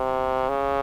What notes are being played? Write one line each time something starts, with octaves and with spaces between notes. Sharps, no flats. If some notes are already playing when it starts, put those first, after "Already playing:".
Already playing: C3
C#3